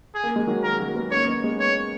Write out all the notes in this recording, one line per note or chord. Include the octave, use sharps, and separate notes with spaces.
G#4
A#3
G#3
D#3 F#3
A#4
F#3 A#3
G#3 B3
A#3 C#4 C#5
B3 D#4
G#3 B3
C#5